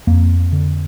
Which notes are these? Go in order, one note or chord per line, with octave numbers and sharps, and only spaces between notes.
F2 A#3
D3